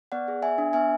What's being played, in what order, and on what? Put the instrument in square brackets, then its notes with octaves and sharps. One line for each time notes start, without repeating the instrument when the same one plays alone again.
[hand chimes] B3 D5 F#5
G#4
B3 E5 G#5
D4
B3 E5 G#5